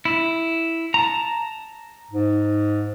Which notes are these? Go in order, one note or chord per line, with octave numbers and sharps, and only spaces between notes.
E4
A5 A#5
G#2